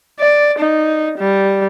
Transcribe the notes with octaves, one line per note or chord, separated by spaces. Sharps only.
D5
D#4
G3